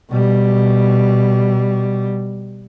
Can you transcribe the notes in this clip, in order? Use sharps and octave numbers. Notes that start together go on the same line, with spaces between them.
B2 G3